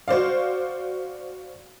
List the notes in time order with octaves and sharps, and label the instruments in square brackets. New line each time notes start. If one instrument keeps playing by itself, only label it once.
[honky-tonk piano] F#4 C5 D5 F5